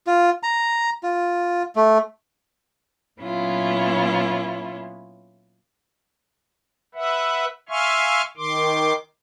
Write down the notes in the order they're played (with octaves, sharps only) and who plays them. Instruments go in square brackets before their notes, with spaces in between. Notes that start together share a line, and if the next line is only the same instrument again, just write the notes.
[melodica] F4
A#5
F4
A3
[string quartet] A#2 F#3 B3 C#4 E4 F4
[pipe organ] B4 E5 F#5
E5 F5 G#5 C6 C#6 F6
D#3 C6 D6